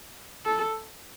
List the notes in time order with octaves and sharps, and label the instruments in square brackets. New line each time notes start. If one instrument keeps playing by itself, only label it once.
[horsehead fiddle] A4